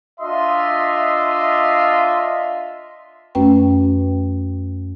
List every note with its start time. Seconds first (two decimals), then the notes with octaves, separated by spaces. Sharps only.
0.21 D4 F4 D#5 E5 C6
3.35 F#2 A3 C#4 F#4 B4 G5